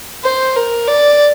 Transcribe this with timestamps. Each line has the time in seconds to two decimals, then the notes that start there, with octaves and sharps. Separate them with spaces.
0.23 C5
0.56 A#4
0.88 D5